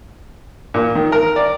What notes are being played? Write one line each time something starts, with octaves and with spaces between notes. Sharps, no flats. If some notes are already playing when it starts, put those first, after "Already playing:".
A#2
D#3
A#4
D5